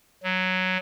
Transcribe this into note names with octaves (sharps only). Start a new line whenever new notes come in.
F#3